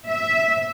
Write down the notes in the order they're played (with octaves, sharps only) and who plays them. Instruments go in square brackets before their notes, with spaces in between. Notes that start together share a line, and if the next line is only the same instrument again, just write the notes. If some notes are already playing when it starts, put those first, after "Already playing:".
[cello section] E5